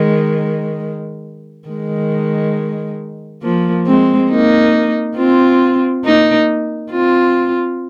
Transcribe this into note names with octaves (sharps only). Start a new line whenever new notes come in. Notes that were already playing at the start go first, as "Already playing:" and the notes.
Already playing: D#3 G#3
D#3 G#3
F3 A#3
G#3 C4
A#3 D#4
C4 F4
A#3 D#4
C4 F4